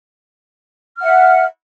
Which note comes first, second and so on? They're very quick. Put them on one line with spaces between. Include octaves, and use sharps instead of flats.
F6 F#5 E5